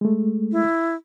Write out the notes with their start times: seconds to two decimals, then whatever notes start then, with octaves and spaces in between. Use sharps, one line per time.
0.01 G#3 A3
0.52 E4